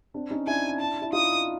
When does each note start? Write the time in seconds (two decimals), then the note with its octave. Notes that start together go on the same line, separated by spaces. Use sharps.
0.14 C4 D4
0.31 C#4 D#4
0.47 D4 E4 G#5
0.80 A5
1.02 E4
1.13 D#4 F4 D#6